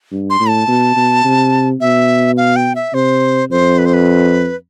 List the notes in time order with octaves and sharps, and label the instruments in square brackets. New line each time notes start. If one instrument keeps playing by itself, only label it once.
[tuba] G2
[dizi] C6
[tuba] A2
[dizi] A5
[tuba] B2
B2
C3
[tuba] B2 [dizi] E5
[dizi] F5
G5
E5
[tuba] C3 [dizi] C5
[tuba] F2 [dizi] C5
[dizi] B4
C5
B4